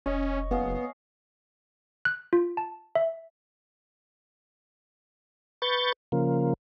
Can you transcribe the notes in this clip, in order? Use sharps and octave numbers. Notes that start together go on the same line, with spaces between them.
F1 C#4 C#5 D#5
F#1 B3 G#4 F5
F#6
F4
A5
E5
B4 C#6 G6 A6
C#3 F3 A#3